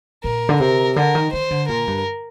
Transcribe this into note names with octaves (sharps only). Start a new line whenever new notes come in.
A#2 A#4
D3
C3 A#4
D3 A#4
D#3
D#3 C5
D3
A#2 A#4
G2